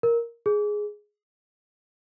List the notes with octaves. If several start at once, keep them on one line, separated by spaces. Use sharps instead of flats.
A#4
G#4